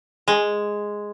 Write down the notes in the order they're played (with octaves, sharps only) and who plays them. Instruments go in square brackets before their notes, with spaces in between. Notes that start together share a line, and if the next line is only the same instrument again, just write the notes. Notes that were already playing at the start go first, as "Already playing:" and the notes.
[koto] G#3